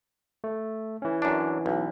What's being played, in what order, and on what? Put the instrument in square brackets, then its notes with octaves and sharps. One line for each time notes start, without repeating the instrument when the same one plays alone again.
[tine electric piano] A3
E3 C#4
[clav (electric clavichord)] F#2 D4
B1